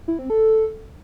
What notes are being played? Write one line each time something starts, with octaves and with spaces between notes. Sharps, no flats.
E4
C4
A4